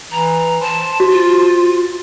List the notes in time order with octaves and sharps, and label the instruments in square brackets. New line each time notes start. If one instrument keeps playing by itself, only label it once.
[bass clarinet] E3 [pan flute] A#5
[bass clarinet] C5 [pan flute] A5
[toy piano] F#4
[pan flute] F4